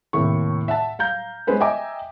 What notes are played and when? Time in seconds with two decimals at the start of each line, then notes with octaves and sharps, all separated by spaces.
0.13 D#2 A2 C3 A#3 E4 C#6
0.68 E5 F#5 A5
0.99 F5 A#5 G6
1.47 G#3 B3 C#4 B4 C5
1.60 D#5 E5 G5 G#5 A#5 D6